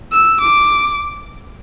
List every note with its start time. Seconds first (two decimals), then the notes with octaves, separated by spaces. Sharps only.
0.12 E6
0.41 D6